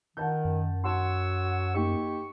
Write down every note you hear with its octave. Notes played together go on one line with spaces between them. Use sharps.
D#3 F#5 A5 G6
F#2
F#4 C#5 F#5 A5 C6 E6
A#3 D#4 G4 C#6